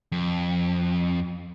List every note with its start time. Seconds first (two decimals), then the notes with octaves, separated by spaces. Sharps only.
0.12 F2